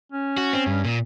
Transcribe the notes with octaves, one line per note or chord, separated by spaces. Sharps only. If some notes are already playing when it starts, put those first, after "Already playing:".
C#4
F#4
C4
G2
A#2